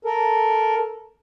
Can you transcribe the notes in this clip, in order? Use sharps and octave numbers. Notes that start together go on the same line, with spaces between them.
A4 A#4